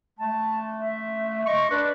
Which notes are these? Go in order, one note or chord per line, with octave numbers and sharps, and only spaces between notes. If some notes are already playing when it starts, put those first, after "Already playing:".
A3 A5
E5
D#5 C#6
D4 B4